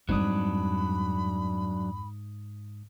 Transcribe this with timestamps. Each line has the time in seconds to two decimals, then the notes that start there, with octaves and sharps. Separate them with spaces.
0.09 F2 G#2 F#3 G3 D4 B5 D#6